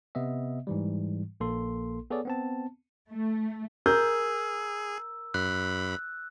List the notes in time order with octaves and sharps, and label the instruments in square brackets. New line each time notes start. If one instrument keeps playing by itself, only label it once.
[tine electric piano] C3 B3 D#5 E5
G#2 E3 G3
A#1 A#3 A4 C6
B3 G#4 A4 C#5 D5
B3 C4 A5
[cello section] A3
[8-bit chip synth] G#4 [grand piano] A#4 G6 [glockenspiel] E6
[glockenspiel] E6
[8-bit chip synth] F#2 B5 [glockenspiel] F#6